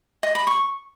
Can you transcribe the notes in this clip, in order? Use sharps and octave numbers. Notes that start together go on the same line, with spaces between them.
D#5
B5
C#6